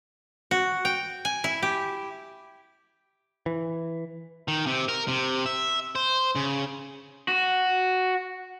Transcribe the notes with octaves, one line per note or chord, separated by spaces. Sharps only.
F#4
G5
G#5
E4
G4
E3
D#3
C3
A#4
C3
E5
C5
C#3
F#4